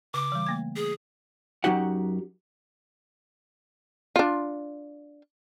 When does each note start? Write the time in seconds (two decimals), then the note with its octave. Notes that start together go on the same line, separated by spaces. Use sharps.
0.14 C#3 D6
0.32 E3 G3
0.47 A3 A#3 G#6
0.76 G#4
1.64 F#2 F#3 D#4 F#4 G4 F#5
4.16 D4 F4